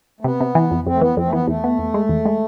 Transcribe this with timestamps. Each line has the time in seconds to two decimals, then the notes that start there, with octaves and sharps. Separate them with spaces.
0.21 A3
0.24 C3 B3
0.41 C3
0.55 E3
0.71 F2
0.87 F2 C4
0.94 A3
1.01 E3 B3
1.17 F2 C4
1.25 A3
1.32 E3 B3
1.48 E2 A3
1.64 B3
1.79 E2
1.94 G#3
2.09 E2
2.25 G#3